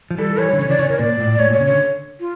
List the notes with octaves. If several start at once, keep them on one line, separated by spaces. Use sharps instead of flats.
F3
E3 G3 A4
E3 G3 C#5
D3
C#3 E3 C#5
C#3 E3 D5
C#3 E3 C#5
C#3 A#4
A#2 D5
A2
A2 C#5
A#2 C#5
C#3
D3 C#5
F4